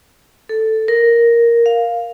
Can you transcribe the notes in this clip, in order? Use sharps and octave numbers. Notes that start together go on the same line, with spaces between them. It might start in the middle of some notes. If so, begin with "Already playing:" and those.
A4
A#4
F5